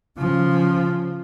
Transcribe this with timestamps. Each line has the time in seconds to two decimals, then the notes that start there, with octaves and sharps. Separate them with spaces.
0.18 C#3 F3